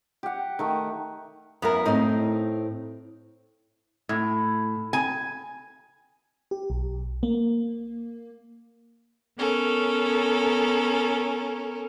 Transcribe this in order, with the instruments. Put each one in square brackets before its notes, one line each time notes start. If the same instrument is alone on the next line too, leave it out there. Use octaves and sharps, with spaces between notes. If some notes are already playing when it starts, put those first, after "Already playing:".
[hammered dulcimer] G4 F#5
D#3 A3
[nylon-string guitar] F#2 F5 G#5 [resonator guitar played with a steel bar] B3 E4 A#4
[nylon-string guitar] A2 C4 [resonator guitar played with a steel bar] D#4
[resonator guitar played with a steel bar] A2
G#5
[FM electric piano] G4
B1
A#3
[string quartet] B3 C#4 A4 A#4